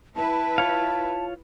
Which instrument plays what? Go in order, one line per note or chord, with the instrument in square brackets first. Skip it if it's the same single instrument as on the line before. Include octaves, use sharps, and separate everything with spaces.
[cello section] E4 B4 [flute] A5
[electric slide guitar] F4 C#5 F5